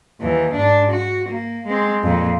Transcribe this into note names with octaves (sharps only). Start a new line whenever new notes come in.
D#2 E3
G#2 D4
F#4
A#3
G#3 C4
F2 A#2